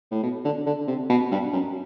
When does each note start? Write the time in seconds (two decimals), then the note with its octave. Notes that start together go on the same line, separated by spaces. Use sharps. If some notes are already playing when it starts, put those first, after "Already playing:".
0.11 A2
0.23 B2
0.45 D3
0.66 D3
0.88 C3
1.10 B2
1.32 G2
1.53 F#2